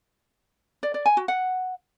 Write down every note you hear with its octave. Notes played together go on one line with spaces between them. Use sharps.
D5
D5
G#5
F#4
F#5